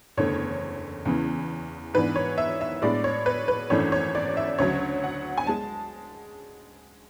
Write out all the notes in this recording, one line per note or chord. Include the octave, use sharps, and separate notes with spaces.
F#1 E2 D3 A3 C#5
E2 C#3 E3
G#2 E3 B3 D4 B4
C#5
E5
E5
A2 G#3 B3 D4 D5
C#5
B4
B4
G#1 F#2 E3 A3 D4 C#5
C#5
D5
E5
D2 C#3 F#3 C#5
F#5
G#5
G#3 A5